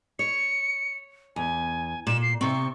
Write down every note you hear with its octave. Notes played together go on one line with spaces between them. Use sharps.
C#5 C#7
E2 G#5
A#2 E7
C7
C3 C4 C#6